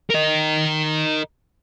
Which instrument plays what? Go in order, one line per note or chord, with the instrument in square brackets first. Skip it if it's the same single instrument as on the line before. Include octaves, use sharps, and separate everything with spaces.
[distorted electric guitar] A#4 D#5